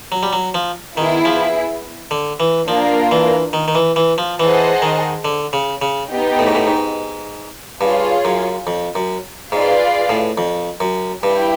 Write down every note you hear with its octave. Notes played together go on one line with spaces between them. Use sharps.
F#3
G3
F#3
F3
D#3 B3 E4 G#4
F3
D3
E3
F3 A#3 D4 F4 A#4
E3
D#3
D#3
E3
E3
F3
E3 G#4 C5 D#5 F#5 A5
D#3
D3
C#3
C#3
B3 D#4 G4
A2
G#2
A2
G#2
G2 F4 G#4 C#5
F#2
F2
F#2
G#2 F4 G#4 B4 D5 F5
A2
F2
F#2
G2 E4 G4